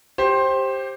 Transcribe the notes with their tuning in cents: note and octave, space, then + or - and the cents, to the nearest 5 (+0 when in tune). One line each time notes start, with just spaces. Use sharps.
G4 +0 C5 +15